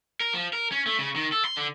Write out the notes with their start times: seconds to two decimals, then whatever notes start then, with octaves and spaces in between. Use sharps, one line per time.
0.20 A#4
0.34 F3
0.53 A#4
0.72 C#4
0.86 A3
0.99 C#3
1.16 D#3
1.32 A4
1.45 C6
1.57 D3